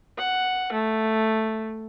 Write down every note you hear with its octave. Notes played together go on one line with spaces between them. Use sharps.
F#5
A3